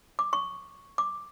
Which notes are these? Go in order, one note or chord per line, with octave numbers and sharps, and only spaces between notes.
D6
C#6
D6